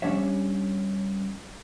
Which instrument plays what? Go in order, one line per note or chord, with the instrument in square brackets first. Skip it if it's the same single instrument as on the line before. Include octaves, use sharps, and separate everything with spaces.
[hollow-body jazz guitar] G3 C#4 D4 C#5 E5